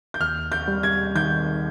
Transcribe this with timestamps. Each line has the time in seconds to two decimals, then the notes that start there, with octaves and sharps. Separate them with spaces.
0.14 G6
0.20 D#2 F6
0.52 G6
0.68 G3
0.83 G#6
1.16 D#3 G6